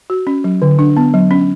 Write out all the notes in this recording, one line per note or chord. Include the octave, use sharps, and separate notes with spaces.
F#4
C#4
F#3
D3
D4
B3
F#3
C#4